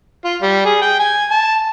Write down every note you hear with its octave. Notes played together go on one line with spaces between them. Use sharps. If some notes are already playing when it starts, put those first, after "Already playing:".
F4
G3
G#4
G5
G#5
A5